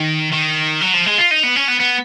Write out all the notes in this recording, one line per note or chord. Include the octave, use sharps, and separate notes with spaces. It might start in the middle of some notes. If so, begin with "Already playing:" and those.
Already playing: D#3
D#3
F#3
F3
G#3
F4
D#4
B3
C#4
B3
B3